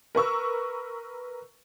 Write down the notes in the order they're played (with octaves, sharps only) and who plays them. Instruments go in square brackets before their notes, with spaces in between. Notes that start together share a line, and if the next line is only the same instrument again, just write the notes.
[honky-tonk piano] A#4 B4 C#6 E6